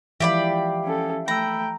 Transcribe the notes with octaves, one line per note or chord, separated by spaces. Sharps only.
E3 F3 G#3 G4 D5 E5 F5 B5
C#4 A4
A3 G5 A#5 B5 E6